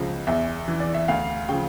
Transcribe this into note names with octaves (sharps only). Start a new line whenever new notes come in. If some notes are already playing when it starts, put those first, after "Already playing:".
Already playing: C#2 C#3 F3
E2 E5
E3
D5
E5
D2 F5
C#3 F3 G5